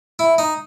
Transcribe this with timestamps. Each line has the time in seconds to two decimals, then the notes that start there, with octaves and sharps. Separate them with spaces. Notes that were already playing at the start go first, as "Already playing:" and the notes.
0.19 E4
0.38 D#4